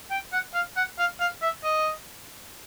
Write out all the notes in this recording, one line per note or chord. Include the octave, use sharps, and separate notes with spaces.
G5
F#5
F5
F#5
F5
F5
E5
D#5